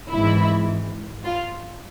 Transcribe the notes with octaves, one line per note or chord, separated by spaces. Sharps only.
G#1 G#2 E3 E4
F4